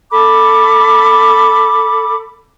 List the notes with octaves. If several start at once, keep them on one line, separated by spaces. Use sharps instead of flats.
A4 B5 D6